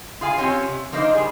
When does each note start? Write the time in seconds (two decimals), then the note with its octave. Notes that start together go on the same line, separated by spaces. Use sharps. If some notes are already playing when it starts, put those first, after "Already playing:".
0.21 F4 G#4 F5 G#5
0.37 C4 C#4 F4 G4 C#5 G#5
0.66 C3
0.93 F3 A#3 D4 D#4 C5
1.15 G3 G#4